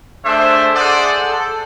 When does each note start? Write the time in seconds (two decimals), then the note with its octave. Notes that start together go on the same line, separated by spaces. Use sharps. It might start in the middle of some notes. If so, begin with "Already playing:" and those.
0.25 A3 D4 G#4 C5 E5 A5
0.75 G#4 A4 C5 D5 F#5
1.29 A4